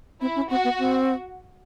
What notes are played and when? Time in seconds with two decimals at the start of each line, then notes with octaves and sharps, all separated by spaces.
0.21 C4 E4
0.36 C#4
0.50 C4 F#4
0.64 B3
0.79 C4